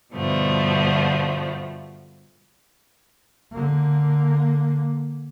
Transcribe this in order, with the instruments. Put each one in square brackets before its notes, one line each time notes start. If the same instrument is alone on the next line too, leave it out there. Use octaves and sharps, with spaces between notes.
[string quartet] G2 B2 D3 F3 A3 B3
[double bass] D3 A#3